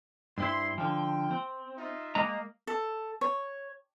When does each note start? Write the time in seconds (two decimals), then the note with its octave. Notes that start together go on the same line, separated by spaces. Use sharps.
0.38 G2 C4 E4 C6
0.78 D3 F3 G5
1.31 C4
1.78 D#4 F4 E5
2.15 G#3 A#3 D#5 A#5
2.67 A4
3.21 C#5